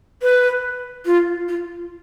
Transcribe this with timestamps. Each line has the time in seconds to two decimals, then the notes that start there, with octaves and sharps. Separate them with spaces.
0.22 B4
1.06 F4
1.48 F4